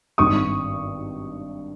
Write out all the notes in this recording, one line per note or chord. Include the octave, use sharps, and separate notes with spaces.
G#1 G2 D#3 C#6 D#6